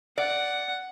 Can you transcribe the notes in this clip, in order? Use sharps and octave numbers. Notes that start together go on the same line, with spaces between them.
D5 F#5